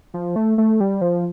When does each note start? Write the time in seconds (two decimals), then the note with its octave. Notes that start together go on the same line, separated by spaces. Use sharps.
0.14 F3
0.36 A3
0.58 A3
0.80 G3
1.01 F3